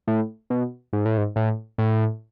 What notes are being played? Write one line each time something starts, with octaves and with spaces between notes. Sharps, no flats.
A2
B2
G#2
A2
G#2
A2
A2